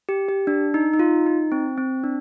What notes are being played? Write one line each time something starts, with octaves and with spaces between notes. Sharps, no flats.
G4
G4
D4
D#4
D#4
F4
D#4
C4
C4
D4